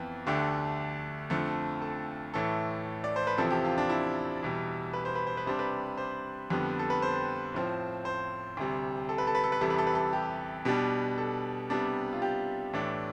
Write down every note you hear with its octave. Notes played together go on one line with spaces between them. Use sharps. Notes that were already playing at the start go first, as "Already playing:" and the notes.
Already playing: F2 E3 B3
D2 D3 A3 D4 G4
F2 D3 F3 A3
A4
A2 E3 A3 A4
D5
C5
B4
E2 C3 F3 C4 A4
G4
F4
D4
E4
E2 B2 G3
B4
C5
B4
C5
B4
C3 G3 D4 C5
B4
C5
F2 D3 G3 B3
A4
B4
C5
A2 F3 C4
C5
D2 C3 G3
A4
B4
A4
B4
A4
B4
E2 C3 G3 A4
B4
A4
B4
A4
G4
B2 G3 B3 D4
A4
C3 G3 B3 D4
F4
G4
A2 E3 A3 D4